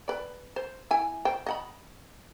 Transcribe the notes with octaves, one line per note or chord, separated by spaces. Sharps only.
B4 D5
C5
E4 G#5
C5 G5
D#5 F#5 B5